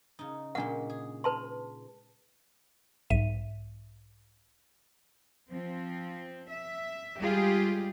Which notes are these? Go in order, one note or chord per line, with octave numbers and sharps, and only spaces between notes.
C#3 D#4
A#2 C#3 G#3 D4 F#5
G#4
B4 A5 C6
B1 G#2 E5 D#7
F3 C4
E5
G3 G#3 F4 G4 G#4